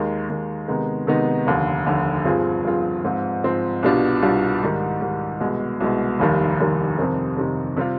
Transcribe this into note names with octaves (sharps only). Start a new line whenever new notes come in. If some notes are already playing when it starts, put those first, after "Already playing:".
Already playing: D#2 D#3 G#3
D#2 D#3 G#3
C3 D#3 G#3 B3 D#4
C3 D#3 G#3 B3 D#4
F1 D#2 D3
F1 D#2 D3
G2 F3 C4 F4 G#4
G2 F3 C4 F4 G#4
G#2 F3 C4
G#2 F3 C4
C2 B2 G3 D4 F4
C2 B2 G3 D4 F4
G#2 D#3 G3
G#2 D#3 G3
C2 B2 G#3
C2 B2 G#3
F1 D#2 D#3 G3
F1 D#2 D#3 G3
F2 C3 D#3 G3 C4
F2 C3 D#3 G3 C4
C3 G3 C4 F4